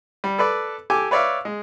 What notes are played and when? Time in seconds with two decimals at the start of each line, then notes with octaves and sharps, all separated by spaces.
0.24 G3
0.38 A4 B4 D5
0.90 G4 A4 G#5 D6
1.11 B4 C#5 D5 E5 F5
1.45 G#3